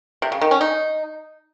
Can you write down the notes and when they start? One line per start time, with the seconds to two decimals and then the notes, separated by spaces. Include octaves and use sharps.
0.22 C3
0.32 C#3
0.41 D#3
0.51 C#4
0.61 D#4